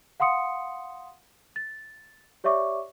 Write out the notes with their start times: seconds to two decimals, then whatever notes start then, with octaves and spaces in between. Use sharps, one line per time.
0.20 F5 F#5 C6 D#6 C#7
1.56 A6
2.44 G4 C#5 D5 E5 C#6 D6